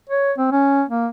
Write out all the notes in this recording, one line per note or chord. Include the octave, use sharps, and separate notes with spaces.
C#5
C4
C#4
A#3